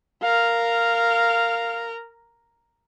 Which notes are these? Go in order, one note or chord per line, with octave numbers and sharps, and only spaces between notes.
A#4 F5